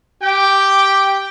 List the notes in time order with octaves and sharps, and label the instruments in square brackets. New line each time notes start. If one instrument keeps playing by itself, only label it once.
[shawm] G4 [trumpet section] G5